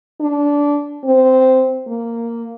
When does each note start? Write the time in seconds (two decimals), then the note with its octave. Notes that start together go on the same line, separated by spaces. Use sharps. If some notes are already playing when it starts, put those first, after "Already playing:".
0.21 D4
1.04 C4
1.87 A#3